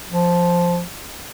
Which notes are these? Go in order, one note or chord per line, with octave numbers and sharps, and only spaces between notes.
F3